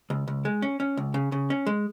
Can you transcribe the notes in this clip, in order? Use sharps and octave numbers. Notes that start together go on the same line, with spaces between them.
C#2
C#2
G#3
C#4
C#4
C#2
C#3
C#3
C#4
G#3